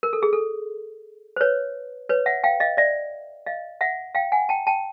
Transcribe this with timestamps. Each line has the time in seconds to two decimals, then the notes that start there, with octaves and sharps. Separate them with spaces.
0.03 A#4
0.13 A4
0.23 G#4
0.33 A4
1.36 C5
1.41 B4 C#5
2.09 B4 C#5
2.26 E5 F#5
2.44 F5 G5
2.60 D#5 F5
2.77 D5 E5
3.46 D#5 F5
3.81 E5 F#5
4.15 F5 G5
4.32 F#5 G#5
4.49 G5 A5
4.67 G5 A5